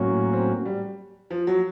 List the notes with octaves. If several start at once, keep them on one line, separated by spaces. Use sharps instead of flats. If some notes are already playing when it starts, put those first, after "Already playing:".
Already playing: A2 F#3 A#3 C#4 F#4
C4
G3
F3
F#3